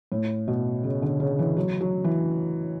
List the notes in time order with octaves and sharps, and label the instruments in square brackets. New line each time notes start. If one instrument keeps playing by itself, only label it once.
[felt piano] A2
B2
C#3
D3
C#3
E3
F#3
F#3
E3